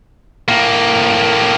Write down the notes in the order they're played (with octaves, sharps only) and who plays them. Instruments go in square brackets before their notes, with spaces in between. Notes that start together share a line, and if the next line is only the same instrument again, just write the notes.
[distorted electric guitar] A2 A#3